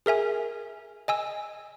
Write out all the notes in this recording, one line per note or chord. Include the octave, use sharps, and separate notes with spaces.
G#4 A#4 E5 G#5
D#5 G#5 E6